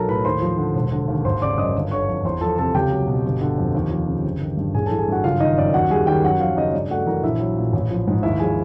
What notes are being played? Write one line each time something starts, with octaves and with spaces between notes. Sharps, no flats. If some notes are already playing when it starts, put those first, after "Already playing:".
Already playing: B1 F#3 A4 A#4 A5 A#5
A2 B4 B5
D#2 C5 C6
F3
D3
E1
D3
D#2
G#1 C5 C6
C#3 D5 D6
F#2 D#5 D#6
G1
D3 C#5 C#6
F2
E2 C5 C6
F3 A4 A5
C3 A4 A5
C#2 G4 G5
F#3
B2
G1
D3
F2
D#2
F3
C#3
G1
D#3
G2
A1 G#4 G#5
E3 A4 A5
G#4 G#5
G2 F#4 F#5
F#1 F4 F5
D#3 D#4 D#5
F#2 D5
D#2 F#4 F#5
G3 G#4 G#5
D#3 G4 G5
F#2 F#4 F#5
F3 F4 F5
C#3 D#4 D#5
G2 D5
A3 F#4 F#5
E3 A#4 A#5
A#1 E4 E5
F#3
A#2
A1
F3
G#2
D#2 E4 E5
F3 G#4 G#5